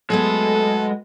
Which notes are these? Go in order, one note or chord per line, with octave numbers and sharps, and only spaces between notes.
F#3 G#3 A3 B3 A4